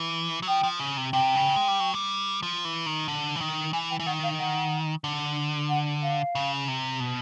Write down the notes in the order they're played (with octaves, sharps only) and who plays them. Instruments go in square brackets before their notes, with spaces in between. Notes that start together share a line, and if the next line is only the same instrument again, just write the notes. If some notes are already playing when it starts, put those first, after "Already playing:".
Already playing: [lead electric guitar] E3
F#3
[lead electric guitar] F3 [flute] G5
[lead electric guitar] F3
C#3
C3
[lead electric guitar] C3 [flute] G5
[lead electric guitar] C#3
G#3
G3
F#3
G3
F3
E3
D#3
D3
E3
D#3
[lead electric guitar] E3 [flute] G#5
[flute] G5
[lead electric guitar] E3
[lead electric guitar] D#3 [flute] F#5
[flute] F5
F#5
[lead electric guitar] D3
[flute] F#5
F5
[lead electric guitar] C#3
C3
B2